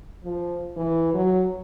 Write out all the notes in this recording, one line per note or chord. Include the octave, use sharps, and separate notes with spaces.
F3
E3
F#3